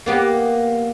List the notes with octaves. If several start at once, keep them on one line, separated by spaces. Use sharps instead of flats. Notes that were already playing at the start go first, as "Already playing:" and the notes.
A#3 B3 G4